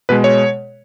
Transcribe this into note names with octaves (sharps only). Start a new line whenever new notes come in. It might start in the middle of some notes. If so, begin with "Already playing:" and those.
B2 G#3 B4
C#5